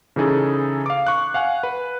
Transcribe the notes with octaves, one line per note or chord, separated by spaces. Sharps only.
C#3 E3 D#4 G#4 A4
F5 D6
C#6 F#6
F5 F#5 G#5 F#6
B4